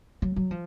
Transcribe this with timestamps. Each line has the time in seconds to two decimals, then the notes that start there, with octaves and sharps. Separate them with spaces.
0.22 F#3
0.36 F#3
0.51 F3